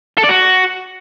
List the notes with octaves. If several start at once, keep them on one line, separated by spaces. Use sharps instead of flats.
A4
D5
F#4